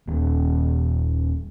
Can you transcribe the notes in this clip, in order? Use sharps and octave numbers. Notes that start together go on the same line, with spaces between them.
D#1